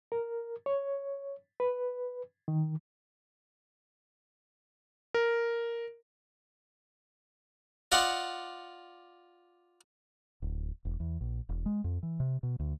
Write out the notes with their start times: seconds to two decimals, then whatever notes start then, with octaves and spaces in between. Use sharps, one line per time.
0.12 A#4
0.66 C#5
1.60 B4
2.48 D#3
5.14 A#4
7.92 F4 D5 D#5 F#5 C6 C#6
10.42 D1
10.85 E1
11.00 E2
11.21 A#1
11.49 E1
11.66 G#3
11.84 F2
12.03 E3
12.20 C3
12.43 B2
12.60 D2